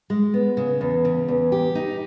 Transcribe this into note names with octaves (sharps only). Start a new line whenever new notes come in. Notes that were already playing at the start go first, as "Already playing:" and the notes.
G#3
B3
C#3
E2
C#3
E2
G4
D#4